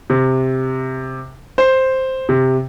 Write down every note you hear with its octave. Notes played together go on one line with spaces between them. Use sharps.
C3
C5
C3